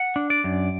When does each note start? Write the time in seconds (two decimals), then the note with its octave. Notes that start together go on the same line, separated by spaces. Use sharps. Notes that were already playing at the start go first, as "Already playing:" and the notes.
Already playing: F#5
0.16 D4
0.30 D5
0.44 F#2